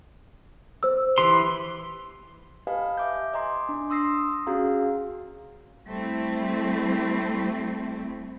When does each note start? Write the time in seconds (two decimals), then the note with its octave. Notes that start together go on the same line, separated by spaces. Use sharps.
0.83 C5 E6
1.18 E3 G4 C6
2.67 G4 B4 D#5 F5 G#5 A5
2.97 E5 D6 G6
3.34 D#5 G#5 A#5 C6 D6
3.69 D4
3.90 C6 D#6 E6 A#6 C7
4.46 C#4 F#4 G#4 F5 A#5
5.87 G3 A3 C4 E4